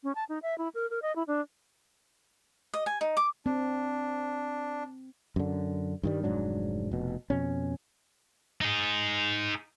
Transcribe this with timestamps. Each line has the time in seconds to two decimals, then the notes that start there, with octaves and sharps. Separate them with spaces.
0.03 C#4
0.15 A5
0.29 D#4
0.42 E5
0.58 E4
0.74 A#4
0.90 A#4
1.02 D#5
1.16 E4
1.27 D4
2.74 D#5
2.86 G#5
3.01 D#4
3.17 D6
3.46 C4 D4
5.36 F#2 D3
6.03 G2 D#3 G3
6.23 F1 G#2 F#3 D4
6.91 F1 B2
7.30 F2 B2 C#4
8.61 D#4 G#4